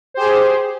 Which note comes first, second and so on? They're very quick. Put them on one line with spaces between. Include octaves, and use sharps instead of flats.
C5 G4 G#4